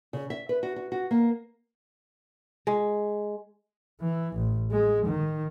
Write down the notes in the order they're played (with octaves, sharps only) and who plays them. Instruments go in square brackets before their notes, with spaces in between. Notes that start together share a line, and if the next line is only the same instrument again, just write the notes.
[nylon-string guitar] C#3
E5
B4
F#4
F#4
F#4
A#3
[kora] G#3
[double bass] E3
A1
G#3
D#3